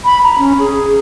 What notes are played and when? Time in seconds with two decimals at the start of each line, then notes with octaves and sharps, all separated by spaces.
0.05 B5
0.23 A#5
0.38 C#4
0.59 G#4